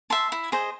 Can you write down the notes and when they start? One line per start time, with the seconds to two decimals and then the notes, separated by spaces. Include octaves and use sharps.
0.10 E5 A5 C6
0.32 E4
0.52 G#4 C5 D#5